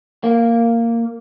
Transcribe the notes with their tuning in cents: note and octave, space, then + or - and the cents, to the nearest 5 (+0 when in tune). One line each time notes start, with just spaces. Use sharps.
A#3 -10